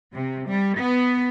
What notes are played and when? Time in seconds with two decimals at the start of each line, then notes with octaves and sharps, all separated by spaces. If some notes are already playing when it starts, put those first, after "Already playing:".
0.15 C3
0.47 G3
0.79 B3